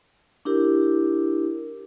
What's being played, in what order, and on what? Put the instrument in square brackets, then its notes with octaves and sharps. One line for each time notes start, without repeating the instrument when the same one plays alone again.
[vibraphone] D4 E4 G4 A#4